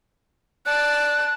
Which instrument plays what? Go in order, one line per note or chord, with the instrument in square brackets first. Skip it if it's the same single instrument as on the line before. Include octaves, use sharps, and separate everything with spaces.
[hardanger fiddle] D5 A5 [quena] F#6